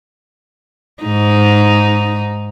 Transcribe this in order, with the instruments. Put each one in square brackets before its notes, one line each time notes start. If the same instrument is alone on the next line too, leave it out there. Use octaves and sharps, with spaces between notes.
[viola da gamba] G#2 D#4